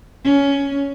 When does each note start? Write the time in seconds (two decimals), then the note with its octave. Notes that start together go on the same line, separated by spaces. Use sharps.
0.25 C#4